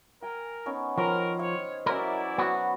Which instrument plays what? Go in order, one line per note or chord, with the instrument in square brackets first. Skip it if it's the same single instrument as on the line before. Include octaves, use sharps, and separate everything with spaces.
[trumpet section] A#4 [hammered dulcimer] G5 G#5
[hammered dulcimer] B3 C#4 D#4
[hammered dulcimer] D#3 C5 C#5 [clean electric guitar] F3 [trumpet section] A#4
[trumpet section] C#5 [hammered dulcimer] F5
[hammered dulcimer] E3 F#3 C#4 [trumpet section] E4 D5 [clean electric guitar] A#4
[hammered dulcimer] F#3 B4 [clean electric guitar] B3 F#4